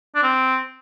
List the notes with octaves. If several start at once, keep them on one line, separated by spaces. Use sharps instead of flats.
D4
C4